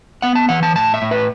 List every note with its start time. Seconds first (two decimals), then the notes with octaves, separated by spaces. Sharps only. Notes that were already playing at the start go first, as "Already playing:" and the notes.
0.22 B3 F#5
0.35 A5
0.49 E3 F#5
0.63 A5
0.76 A2 A5
0.94 E5
1.02 A2
1.11 B4